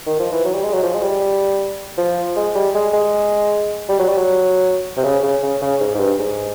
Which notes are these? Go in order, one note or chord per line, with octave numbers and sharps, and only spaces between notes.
D#3
F3
E3
F#3
G3
G#3
F#3
F3
G#3
G3
F3
G#3
G3
G#3
G#3
G3
F#3
G3
F#3
C3
C#3
C#3
C#3
C#3
G#2
G#2
G2
G#2